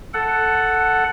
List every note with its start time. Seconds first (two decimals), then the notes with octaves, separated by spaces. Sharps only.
0.14 A4 F#5